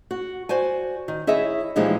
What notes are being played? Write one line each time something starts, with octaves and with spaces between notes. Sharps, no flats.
F#4
F#4 C5 D5 G#5
D#3
E4 G#4 C#5 D#5 E5
A#2 E3 F3 G#3 D#4 G4